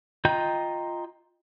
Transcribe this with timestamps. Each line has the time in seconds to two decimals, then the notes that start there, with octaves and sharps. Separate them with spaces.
0.25 F4 D#5 G5 A#5 G6